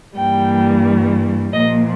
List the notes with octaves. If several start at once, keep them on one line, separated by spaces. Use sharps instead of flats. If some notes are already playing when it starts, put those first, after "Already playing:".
G2 E3 G3 A#3 G5
A#2 F3 A#3 D#5